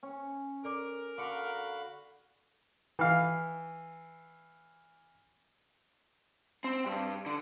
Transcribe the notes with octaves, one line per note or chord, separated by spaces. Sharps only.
C#4 C#5
A4 A#4 D5 D6
D3 F#4 F5 B5 D6 C#7
E3 F5
C4
G2
D3